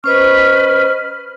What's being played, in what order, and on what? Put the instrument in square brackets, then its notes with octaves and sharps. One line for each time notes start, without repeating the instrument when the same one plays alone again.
[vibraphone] C#4 C5 D#5 [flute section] B4 F6